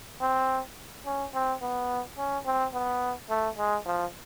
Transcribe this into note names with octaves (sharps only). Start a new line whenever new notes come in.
C4
C#4
C4
B3
C#4
C4
B3
A3
G#3
F3